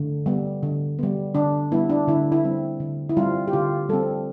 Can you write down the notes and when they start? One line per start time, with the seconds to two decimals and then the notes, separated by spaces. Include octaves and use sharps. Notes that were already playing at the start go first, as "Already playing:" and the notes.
Already playing: D3
0.26 G3 B3
0.63 D3
0.99 G3 B3
1.35 D3 D4
1.72 G3 B3 E4
1.90 D4
2.08 D3 E4
2.32 E4
2.44 G3 C4
2.80 D3
3.10 E4
3.17 G3 C4 F4
3.48 G4
3.53 D3 F4
3.89 G3 C4 A4